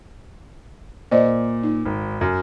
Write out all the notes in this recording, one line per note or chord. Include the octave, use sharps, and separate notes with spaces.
A#2 C5 D5 D#5
D#4
G#1
F#2